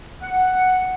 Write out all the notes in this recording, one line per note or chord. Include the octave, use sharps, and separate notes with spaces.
F#5